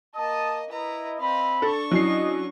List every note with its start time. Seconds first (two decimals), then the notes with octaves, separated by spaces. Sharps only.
0.16 A#3 D#5 A5 D#6
0.71 E4 B4 D#5 A#5
1.20 C4 D#5 F5 B5
1.62 D4 A4 C#6
1.91 F#3 C#4 E4 D#5 C7